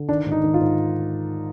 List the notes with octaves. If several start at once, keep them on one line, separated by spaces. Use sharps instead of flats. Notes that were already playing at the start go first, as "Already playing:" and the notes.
Already playing: D3
D#3 D4
G#2
D#4
D#3
F4
G#2